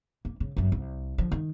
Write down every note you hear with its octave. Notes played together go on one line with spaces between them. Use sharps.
A#3
C#3
G1 F#2
C2
D3 F3
D#3